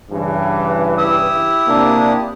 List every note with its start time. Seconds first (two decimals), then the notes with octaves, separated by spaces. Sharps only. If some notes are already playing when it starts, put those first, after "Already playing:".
0.11 G2 C#3 E3
0.98 E4 G4 D#6 E6
1.68 C3 A#3 D4